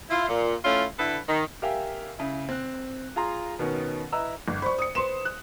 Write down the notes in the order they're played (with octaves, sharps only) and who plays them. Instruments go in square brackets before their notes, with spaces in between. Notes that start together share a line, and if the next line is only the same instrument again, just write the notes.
[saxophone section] E4 F4
A#2
A3 C#4 E4 F4
D3 E4 A4 B4
D#3
[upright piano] G4 A#4 E5 F5 G5 G#5
C#3 E4
C4 F#6
F4 G#4 A#5 C6
B2 D#3 B3 C#4
E4 B4 D#5 A#5 E6
[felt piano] G1
[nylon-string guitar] C5 D5 [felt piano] B5 C#6
[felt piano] D#6 C#7
[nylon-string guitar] B4 C5 [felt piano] C6 E7
[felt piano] F#6